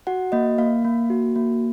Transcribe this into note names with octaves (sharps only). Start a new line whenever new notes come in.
F#4 F#5
A#3 D#5
A#3 F5
A#3
F#4
A#3